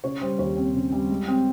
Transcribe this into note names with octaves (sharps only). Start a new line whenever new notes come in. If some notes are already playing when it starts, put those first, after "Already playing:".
C#3 C#5
G3 C5
D#2 C#5
C4
C#3
G3
G#3
C4